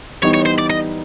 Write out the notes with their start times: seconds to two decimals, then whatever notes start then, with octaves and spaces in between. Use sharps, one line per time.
0.22 E3 G3 B3 D#4 C#5
0.34 C#5
0.46 C5
0.59 D5
0.70 D#5